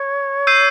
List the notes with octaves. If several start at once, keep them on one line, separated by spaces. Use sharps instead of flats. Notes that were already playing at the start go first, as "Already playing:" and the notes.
Already playing: C#5
E6 G6 C7 D#7